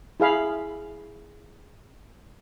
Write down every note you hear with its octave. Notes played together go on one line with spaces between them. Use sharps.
E4 G#4 F5 B5